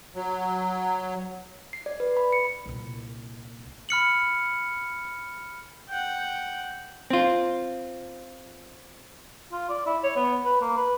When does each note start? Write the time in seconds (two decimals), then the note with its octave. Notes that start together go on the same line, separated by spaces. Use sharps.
0.15 F#3
1.73 C7
1.86 D5
2.00 B4
2.17 B5
2.33 C#7
2.66 C2 A#2
3.89 B5 F6 C#7 F#7
5.89 F#5 G5
7.10 C4 F4
9.52 F4
9.70 D5
9.86 E4
10.04 C#5
10.16 B3
10.45 B4
10.61 A#3
10.77 B4